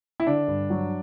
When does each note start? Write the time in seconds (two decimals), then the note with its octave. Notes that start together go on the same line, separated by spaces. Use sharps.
0.20 E4
0.27 D3 D4
0.48 G2
0.70 F#3